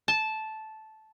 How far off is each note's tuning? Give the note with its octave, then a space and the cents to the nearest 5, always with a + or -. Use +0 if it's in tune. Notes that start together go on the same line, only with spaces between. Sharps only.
A5 -10